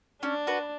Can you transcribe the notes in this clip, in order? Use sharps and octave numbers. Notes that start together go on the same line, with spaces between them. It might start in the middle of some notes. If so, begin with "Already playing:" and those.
C#4 D4
F#4 B4